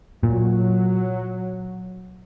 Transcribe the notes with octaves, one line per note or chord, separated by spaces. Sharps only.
A#2 F#3